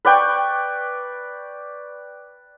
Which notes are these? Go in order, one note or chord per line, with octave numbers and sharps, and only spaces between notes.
B4 D5 G5 C#6